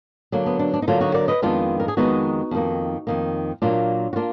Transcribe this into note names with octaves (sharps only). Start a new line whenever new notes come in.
D3 F#3 A#3 D4
B3
D4
D4
D#4
D3 F#3 A#3 D4 F4
D#4 F#4
A#4 D5
B4 D#5
F2 D#3 G#3 B3 D4 F4
A#4
G#4
F2 D#3 G#3 B3 D#4 F#4
F2 D#3 A#3
F2 D#3 A#3
A#2 F#3 A#3 D4 F4
F#4
A#3 D4 F4